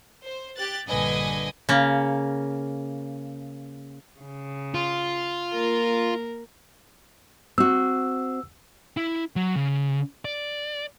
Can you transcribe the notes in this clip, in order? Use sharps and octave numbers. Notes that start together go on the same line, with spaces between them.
C5
G4 F#6 A6
A#1 G2 D3 B4 D#5 G#5
C#3 A#3
C#3
F4
A#3 A#4
C4 F#4 E6
E4
F#3
C#3
D5